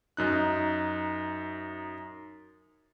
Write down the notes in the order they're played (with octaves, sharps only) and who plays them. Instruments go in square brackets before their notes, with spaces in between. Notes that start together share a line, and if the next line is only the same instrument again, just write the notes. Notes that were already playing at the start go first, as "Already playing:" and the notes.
[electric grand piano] F#2 D#4 F#6